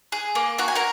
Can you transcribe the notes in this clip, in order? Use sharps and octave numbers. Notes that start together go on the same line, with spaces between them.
G#4
A#3
F#4 A#5
G#5
A#4 A#5